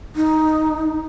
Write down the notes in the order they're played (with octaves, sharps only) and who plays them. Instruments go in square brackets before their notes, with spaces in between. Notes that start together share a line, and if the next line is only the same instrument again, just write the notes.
[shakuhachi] D#4